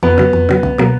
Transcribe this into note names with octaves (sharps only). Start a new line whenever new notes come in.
F2 B3
C#3 F#3
F2
C#3 F#3
C#2
B2 F#3 A#3